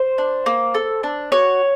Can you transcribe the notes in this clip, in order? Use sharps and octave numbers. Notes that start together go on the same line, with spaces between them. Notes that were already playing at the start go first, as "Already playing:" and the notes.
Already playing: C5
D4
A#3
A4
D4
F#4 C#5